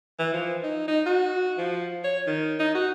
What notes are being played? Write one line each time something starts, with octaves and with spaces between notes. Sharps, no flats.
E3
F3
D#4
D#4
F#4
F3
C#5
D#3
D#4
F#4